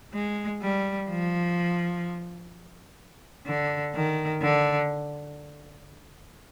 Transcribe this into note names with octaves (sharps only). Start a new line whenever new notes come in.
G#3
G3
F3
D3
D#3
D3